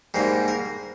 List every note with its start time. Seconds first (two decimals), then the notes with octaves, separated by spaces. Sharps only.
0.14 G#2 G3 A#3
0.48 A#4